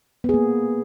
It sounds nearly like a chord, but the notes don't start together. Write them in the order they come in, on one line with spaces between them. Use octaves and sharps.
B3 G#4 A#3